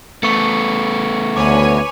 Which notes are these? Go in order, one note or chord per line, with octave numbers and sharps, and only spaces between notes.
A3 B3 C#6 C#7
D2 B4 C#5 G#5 D6